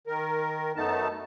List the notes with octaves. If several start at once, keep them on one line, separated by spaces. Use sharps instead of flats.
D#3 A#4
F#2 A3 B3 D#4 A5